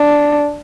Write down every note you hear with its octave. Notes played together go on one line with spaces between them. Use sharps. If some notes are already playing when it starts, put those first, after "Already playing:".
Already playing: D4